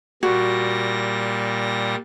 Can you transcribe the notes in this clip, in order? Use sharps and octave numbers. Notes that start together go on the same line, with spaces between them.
A#2 G3 F#4 A#6